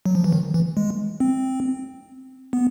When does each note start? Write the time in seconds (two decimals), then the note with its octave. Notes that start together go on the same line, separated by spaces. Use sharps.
0.06 F#3
0.15 F3
0.24 E3
0.32 D#3
0.54 E3
0.77 G#3
1.20 C4
2.53 B3